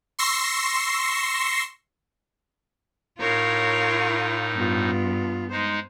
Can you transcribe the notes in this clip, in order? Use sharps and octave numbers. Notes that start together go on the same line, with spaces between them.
C6 C#6 E6 A#6 C7
A2 D#4 F4 A#4 C#5 C7
G2 B3 F4
G#3 D#4 C5